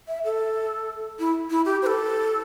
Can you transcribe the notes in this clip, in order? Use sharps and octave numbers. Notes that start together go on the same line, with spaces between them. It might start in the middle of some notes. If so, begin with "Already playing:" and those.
E5
A4
E4
E4
G4
C5
A4